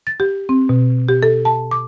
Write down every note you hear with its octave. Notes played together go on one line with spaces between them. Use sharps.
A6
G4
C4
B2
G4
A4
A5
D6